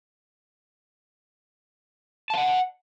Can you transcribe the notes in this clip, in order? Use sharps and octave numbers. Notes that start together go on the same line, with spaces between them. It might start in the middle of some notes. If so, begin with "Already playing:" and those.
F5 F#5 A5